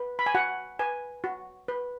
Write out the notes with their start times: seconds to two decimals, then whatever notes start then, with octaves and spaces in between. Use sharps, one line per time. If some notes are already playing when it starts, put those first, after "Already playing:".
Already playing: B4
0.19 B5
0.26 G#5
0.35 F#4 F#5
0.79 B4 G#5
1.24 F#4
1.68 B4